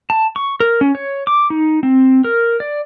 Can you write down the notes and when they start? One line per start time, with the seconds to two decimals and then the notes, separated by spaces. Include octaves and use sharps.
0.10 A5
0.36 C#6
0.60 A#4
0.81 C#4
0.95 C#5
1.27 D6
1.50 D#4
1.83 C4
2.24 A#4
2.60 D5